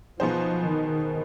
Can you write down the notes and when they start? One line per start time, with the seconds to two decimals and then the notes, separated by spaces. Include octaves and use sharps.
0.20 B2 F3 B3 D#4 G#4 C5
0.68 D#3